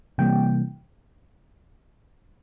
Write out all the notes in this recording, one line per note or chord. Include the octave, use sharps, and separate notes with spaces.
C3 E3 G3 A#3 G5